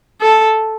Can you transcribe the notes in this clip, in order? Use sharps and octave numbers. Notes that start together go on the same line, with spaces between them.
A4